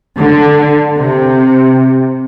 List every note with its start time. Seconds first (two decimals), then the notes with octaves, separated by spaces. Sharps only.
0.17 D3
0.98 C3